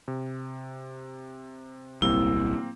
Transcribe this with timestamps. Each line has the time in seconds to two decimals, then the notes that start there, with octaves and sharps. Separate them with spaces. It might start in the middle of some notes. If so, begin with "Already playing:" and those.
0.08 C3
2.02 D1 B1 G3 A#3 C4 E4